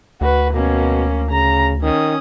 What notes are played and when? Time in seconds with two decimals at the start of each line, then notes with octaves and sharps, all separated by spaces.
0.21 D2 F#4 B4
0.54 B2 A#3 C#4
1.31 C#3 A#5
1.82 D#3 C#4 D#6